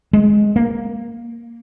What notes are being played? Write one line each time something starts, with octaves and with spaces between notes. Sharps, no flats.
G#3
A#3